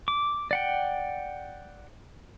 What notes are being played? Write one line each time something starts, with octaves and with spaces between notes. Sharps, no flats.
D6
D5 F#5 G5